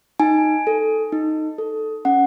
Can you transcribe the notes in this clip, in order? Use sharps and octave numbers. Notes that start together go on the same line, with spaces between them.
D#4 G#5
A4
D#4
A4
C#4 F#5